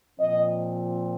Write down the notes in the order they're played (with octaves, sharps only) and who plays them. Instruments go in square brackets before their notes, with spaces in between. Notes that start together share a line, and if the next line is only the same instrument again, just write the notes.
[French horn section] A#2 F3 C4 D#5